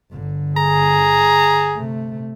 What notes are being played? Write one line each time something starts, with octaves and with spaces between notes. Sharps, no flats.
G1 D3
G#4 A#5
C3 A3